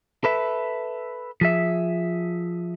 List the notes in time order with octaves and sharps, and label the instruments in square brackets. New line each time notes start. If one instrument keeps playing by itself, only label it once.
[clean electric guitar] A4 B4 E5
F3 G#4 E5